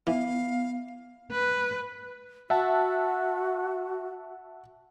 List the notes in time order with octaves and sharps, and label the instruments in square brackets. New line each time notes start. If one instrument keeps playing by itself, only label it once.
[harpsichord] E3 [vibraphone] B3 [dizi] F5
[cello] B4
[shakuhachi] F#4 [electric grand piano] E5 F#5 A5